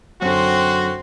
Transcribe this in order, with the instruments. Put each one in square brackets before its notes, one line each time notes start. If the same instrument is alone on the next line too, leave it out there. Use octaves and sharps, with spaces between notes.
[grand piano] F#2 D3 [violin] C4 C6 [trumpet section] F#4